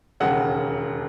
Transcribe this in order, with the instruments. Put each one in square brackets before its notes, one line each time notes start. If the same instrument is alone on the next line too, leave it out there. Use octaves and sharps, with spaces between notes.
[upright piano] E1 D#2 C#3 F#5